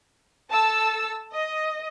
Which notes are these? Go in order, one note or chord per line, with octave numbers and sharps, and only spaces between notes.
A4 A5 E6
D#5